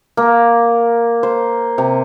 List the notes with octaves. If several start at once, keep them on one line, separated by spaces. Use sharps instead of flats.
A#3
C5
C3